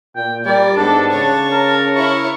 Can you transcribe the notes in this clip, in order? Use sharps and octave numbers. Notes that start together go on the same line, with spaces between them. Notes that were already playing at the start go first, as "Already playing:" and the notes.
A#2 G5
G3 A#4 D5
G#2 B3 D4 A4 A5
C#3 C#5
A#4
E4 C#5 C#6